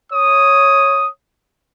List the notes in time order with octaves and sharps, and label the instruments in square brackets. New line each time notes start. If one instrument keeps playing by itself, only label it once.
[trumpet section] C#5 D#6